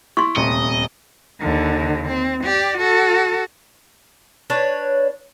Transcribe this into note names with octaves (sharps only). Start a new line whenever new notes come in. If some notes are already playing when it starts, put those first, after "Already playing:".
E4 C6 C#6
D#1 D2 C3 D#5 C#7
D#2 D3
C4
G4 D5
F#4 A4
D4 B4 C#5